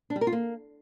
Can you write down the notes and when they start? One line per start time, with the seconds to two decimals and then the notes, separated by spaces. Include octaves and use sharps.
0.10 D4
0.16 G3
0.21 A#4
0.27 F4
0.33 A#3